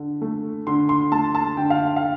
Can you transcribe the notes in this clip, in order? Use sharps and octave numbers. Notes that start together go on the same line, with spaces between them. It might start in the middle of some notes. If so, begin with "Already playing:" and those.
Already playing: D3
A3
D3 C6
C6
A3 A5
A5
D3 G5
F5
F5